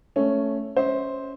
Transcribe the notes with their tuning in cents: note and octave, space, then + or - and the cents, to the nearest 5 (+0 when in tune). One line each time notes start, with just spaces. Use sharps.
A3 +0 C#4 +0
C#4 +0 C5 +0 E5 -40